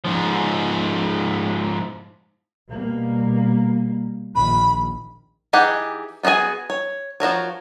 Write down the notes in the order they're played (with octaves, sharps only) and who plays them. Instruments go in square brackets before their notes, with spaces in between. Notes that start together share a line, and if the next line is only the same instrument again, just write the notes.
[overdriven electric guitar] G#2 F3
[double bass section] B2 G3 A#3
[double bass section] A#1 D#3 [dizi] B5
[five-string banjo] E3 D#4 G4 G#4 F#5
B3 D#4 F#4 G#4 G#5
C#5
F3 F#4 A#4 C#5